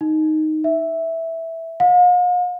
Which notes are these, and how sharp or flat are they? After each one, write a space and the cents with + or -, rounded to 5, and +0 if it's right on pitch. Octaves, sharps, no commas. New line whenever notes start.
D#4 +0
E5 -5
F5 +45